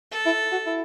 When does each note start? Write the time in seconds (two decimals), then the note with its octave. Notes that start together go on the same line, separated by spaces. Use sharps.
0.11 A4
0.26 E4
0.52 F#4
0.66 E4